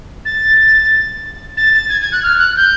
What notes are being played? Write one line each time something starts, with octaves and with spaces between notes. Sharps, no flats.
A6
A6
A6
G#6
G#6
F#6
F6
F#6
G6